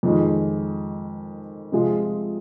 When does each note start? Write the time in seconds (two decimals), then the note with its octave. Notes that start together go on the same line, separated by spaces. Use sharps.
0.03 F2 D#3 G#3
1.72 C3 F3 G#3 F4 G#4